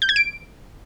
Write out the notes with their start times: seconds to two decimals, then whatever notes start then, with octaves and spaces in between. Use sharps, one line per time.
0.02 G6
0.09 G#6
0.16 D7